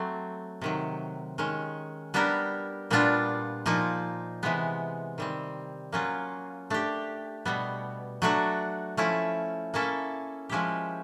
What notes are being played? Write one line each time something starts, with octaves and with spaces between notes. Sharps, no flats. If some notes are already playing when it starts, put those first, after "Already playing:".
Already playing: F#3 A3 C4
C3 D#3 F#3
D#3 G#3 C#4
G3 B3 D4 G4 A#4
A#2 G3 B3 D4 F4
A#2 F3 A#3 D#4
C3 E3 G#3 B3
D#3 G3 C4
F#3 A#3 C#4 F4
A3 D4 G4
B2 G3 B3
F#3 A3 D4 F#4
F3 A3 C#4 E4
A#3 C#4 E4 A4
F3 G#3 C#4 E4 G4